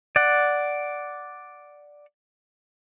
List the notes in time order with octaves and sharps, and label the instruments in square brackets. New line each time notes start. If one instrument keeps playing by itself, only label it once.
[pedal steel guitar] D5 F#5